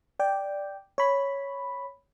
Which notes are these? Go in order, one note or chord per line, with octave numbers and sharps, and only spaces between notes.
D5 G5
C#5 B5